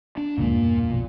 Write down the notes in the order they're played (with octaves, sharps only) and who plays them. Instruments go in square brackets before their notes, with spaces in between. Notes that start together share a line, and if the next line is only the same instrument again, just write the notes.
[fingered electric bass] D4
[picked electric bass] F#1 D2 G#3 [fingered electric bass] A#2 A#3
[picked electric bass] E1 G2
B1 F2 B2